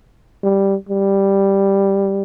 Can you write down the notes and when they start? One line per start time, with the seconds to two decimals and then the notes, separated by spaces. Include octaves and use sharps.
0.44 G3
0.89 G3